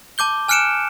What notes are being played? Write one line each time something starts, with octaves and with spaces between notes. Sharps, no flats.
A5 D6 G6 G7
G#5 F6 F#6 C#7 D7 E7